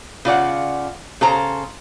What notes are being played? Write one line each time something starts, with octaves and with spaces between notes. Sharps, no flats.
C#3 F4 D5 F#5
C#3 A4 C5 A#5